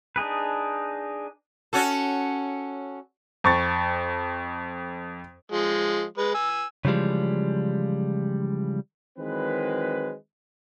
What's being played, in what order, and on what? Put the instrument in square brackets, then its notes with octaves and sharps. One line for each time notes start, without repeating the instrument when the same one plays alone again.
[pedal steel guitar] D4 D#4 G#4 B4
[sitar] C#4 F#4 A4
[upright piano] F2 C#6 A6
[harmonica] F3 G#3
G#3 B4
G#5 E6
[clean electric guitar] C#3 E3 F3 G3 G#3
[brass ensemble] D#3 E3 F#3 G#3 C4 B4